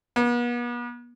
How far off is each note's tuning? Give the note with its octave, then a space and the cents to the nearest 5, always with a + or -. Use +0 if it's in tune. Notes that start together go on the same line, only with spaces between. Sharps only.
B3 -40